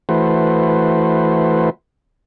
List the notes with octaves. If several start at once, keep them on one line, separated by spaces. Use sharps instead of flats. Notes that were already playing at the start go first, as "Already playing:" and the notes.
E3 A3 F#4 B4 C5